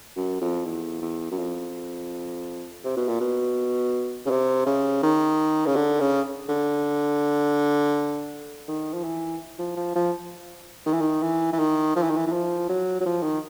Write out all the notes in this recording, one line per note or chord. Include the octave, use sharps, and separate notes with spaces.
F#2
F2
E2
E2
F#2
F2
C3
B2
A#2
B2
C#3
C3
C#3
D#3
C#3
D3
C#3
D3
D#3
F3
E3
F3
F3
F3
D#3
E3
D#3
E3
E3
D#3
F3
E3
D#3
E3
E3
F3
F#3
F#3
F3
D#3